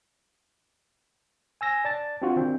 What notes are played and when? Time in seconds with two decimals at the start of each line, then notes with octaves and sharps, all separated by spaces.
1.61 G#5 E6 A#6
1.85 D5 A5 A6
2.22 C4 D4 F4 F#4
2.36 D#3 C4 D4